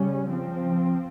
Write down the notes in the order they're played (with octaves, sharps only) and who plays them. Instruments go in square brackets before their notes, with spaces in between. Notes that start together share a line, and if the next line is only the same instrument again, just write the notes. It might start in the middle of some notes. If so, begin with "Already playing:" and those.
Already playing: [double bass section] C#3 G3 C#4
F3 C4